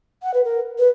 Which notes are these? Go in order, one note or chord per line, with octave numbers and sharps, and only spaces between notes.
F#5
B4
A#4
B4